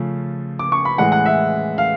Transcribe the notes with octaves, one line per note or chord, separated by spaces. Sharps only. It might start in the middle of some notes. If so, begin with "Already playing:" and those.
Already playing: C#3 F3 A3
D6
C#6
B5
A2 E3 G#3 F#5
F#5
E5
F5